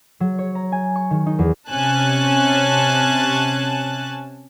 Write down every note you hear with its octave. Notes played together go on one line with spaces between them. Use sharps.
F#3
C#5
A#5
G#5
C#6
D#3
D#4
E2
C3 C#4 G#5 A5 F#6